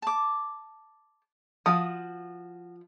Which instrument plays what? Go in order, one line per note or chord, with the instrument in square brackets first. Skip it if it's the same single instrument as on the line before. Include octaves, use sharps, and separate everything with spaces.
[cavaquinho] A5 D6
[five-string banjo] F3 [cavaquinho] F#4 D#6